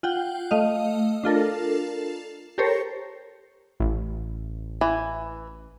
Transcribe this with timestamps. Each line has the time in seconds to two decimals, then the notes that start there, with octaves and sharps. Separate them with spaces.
0.03 F4 F#5 G5
0.51 A3 D#5 F5
1.24 D4 F4 A4 A#4
2.58 G4 A4 A#4 C5 C#5
3.80 A1
4.81 E3